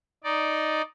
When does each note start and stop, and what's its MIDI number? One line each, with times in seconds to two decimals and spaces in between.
0.24 0.82 63
0.24 0.82 74